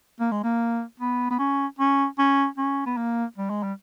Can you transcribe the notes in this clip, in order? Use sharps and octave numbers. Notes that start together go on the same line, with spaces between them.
A#3
G#3
A#3
B3
B3
C#4
C#4
C#4
C#4
B3
A#3
G3
G#3
G3